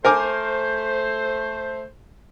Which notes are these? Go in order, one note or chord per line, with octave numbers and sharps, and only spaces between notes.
A3 A#4 C5 G#5 D6